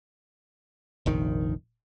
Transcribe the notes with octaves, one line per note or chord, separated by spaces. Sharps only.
F1 A#1 D#3